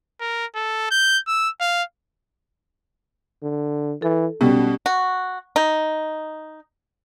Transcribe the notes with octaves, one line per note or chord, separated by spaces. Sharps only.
A#4
A4
G6
E6
F5
D3
E3 A4
B1 B2 G3 C#4
F#4
D#4